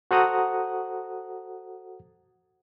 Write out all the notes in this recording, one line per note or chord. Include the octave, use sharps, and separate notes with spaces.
F#4 A4 C5 F#5 A#5 D#6